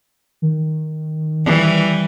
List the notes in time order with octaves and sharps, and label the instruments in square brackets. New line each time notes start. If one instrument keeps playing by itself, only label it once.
[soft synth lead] D#3
[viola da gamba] E3 G3